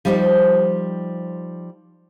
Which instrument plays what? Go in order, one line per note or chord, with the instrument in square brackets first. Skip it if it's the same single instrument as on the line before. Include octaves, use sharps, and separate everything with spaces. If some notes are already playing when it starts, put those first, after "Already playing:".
[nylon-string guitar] F3 G3 D#4 G4 C5